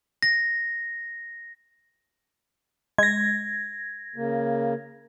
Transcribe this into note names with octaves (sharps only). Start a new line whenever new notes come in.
A#6
G#3 G#6 A#6
C#3 A#3